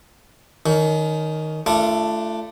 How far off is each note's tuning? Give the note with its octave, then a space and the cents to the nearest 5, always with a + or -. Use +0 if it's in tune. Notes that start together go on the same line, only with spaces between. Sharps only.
D#3 +0 C#4 +30
A3 +0 D4 +5 F4 -35